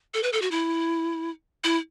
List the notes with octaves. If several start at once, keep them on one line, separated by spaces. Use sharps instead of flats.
A4
B4
A4
F#4
E4
E4